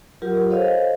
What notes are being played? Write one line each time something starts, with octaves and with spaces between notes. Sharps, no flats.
F#3 F4 G4 A#4
A4 C5 C#5 D#5 F5